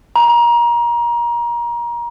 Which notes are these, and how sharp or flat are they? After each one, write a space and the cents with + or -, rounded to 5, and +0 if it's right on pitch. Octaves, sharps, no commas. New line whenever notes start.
A#5 +25